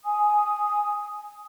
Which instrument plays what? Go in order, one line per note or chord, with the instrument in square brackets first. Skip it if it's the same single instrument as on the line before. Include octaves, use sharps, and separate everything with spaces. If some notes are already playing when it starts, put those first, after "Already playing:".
[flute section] G#5 D#6